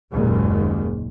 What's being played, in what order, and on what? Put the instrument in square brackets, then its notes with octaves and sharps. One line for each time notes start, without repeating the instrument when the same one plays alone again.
[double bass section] F#1 D#2 A#2 D#3 G#3